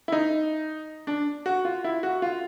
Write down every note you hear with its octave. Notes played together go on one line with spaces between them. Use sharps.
E4
D#4
D4
F#4
F4
E4
F#4
F4